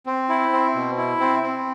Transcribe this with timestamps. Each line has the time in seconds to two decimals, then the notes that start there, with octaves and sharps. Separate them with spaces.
0.06 C4
0.29 E4
0.52 C4
0.75 B2
0.97 E4
1.20 C4
1.43 C4